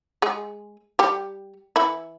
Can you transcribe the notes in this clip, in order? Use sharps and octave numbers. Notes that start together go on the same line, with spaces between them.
G#3 G#4
G3 G4
E3 E4